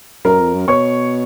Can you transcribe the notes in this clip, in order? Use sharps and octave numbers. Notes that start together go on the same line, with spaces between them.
F#2 A#4 A#5
F2
F#2
B2 C#5 C#6